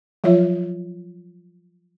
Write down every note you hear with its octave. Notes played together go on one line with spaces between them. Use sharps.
F3 F#3 F4 C#5 E5